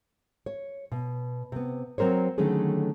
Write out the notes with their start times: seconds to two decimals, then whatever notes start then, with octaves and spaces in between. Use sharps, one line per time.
0.46 C#5
0.92 B2
1.52 C3 B3
1.98 F#3 C4 A#4 C5 C#5
2.38 D3 D#3 F#3 A3 C#4 G#4